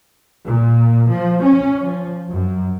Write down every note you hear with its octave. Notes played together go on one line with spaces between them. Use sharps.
A#2
F3
C#4
F3
F#2